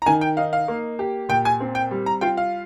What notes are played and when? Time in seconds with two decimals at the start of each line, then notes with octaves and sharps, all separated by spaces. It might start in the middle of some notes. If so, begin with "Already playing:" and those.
0.02 A#5
0.06 D#3 G#5
0.21 G5
0.37 D#4 F5
0.53 F5
0.68 A#3
0.99 G4
1.29 A#2 G5
1.45 G#5
1.60 C4
1.75 G5
1.91 G3
2.06 A#5
2.21 F4 G5
2.37 F5